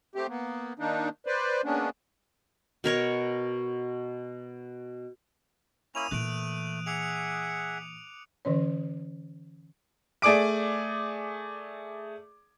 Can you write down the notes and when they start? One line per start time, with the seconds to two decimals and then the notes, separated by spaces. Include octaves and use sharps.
0.15 A3 C4 G4
0.29 A#3 B3
0.79 D#3 A#3 D4 D#4
1.26 B4 C5 D5
1.64 G#3 A#3 B3 C#4 D4
2.84 B2 A#4 C#5 C#6
5.95 A#3 C#4 E4 D#6 D#7 F7
6.11 A#2 E3 A3 F#6 D7
6.86 G#4 E5 F#5 D6 C#7 F7
8.45 D3 E3 C#4 C#5
10.22 A3 G#4 D5 D6 D7